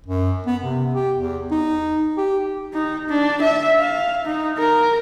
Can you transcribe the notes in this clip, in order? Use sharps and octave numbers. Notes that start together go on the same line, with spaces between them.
F#2
B3
C3
G4
E2
D#4
G4
D#4
D4
E5
F5
D#4
A#4